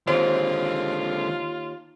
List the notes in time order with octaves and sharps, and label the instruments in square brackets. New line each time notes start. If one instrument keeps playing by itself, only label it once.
[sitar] D#2 [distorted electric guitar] D3 G#3 [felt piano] C4 [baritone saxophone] F4